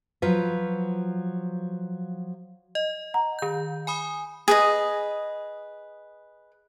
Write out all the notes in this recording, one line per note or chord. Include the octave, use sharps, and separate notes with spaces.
F3 F#3 F4 B4
D#5
F#5 A#5
D#3 G6
G#5 B5 D#6
G#4 B4 D#5